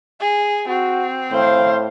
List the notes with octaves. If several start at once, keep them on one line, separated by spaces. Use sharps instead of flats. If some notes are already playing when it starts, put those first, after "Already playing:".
G#4
C4 F#4
A2 C5 F5